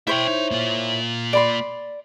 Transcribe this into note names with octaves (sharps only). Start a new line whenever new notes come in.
E4 C5 C#5 E5 G5
D#4
A#3 F4
D5 B5 C6